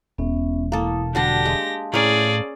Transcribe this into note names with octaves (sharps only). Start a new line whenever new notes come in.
E1 B3 C#4 E5
A#3 E4 A4 D#6
D3 G3 D4 F#4 G4 F#5 A#6
G#3 F5 A5 C6
A2 C#4 G#4 A#4 D5